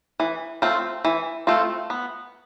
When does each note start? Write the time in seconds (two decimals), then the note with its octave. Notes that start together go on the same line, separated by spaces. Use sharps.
0.20 E3
0.62 A3 C4 F4
1.05 E3
1.47 A3 C4 F4
1.90 B3